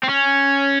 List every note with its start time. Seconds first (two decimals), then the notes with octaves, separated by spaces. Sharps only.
0.03 C4
0.09 C#4